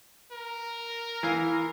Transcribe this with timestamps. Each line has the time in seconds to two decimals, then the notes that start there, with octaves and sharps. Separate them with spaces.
0.32 A#4
1.23 E3 F5